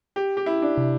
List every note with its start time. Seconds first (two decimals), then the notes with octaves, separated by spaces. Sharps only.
0.16 G4
0.37 G4
0.46 E4
0.62 D4
0.78 C3